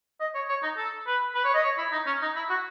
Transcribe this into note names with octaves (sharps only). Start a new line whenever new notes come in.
D#5
C#5
C#5
D#4
A4
B4
B4
C#5
D#5
C#5
E4
D#4
C#4
D#4
E4
F#4